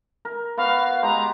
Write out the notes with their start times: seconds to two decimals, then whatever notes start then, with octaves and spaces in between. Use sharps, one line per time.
0.25 A#4
0.57 B3 F#4 F5
1.03 G#3 G4 A#5